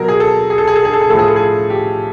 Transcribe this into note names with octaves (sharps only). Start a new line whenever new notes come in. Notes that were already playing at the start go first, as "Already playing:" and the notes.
Already playing: B2 F#3 A#4
G#4
A4
G#4
A4
G#4
A4
G#4
A4
G#4
A2 F3 G#4 A4
A4
G#4
G4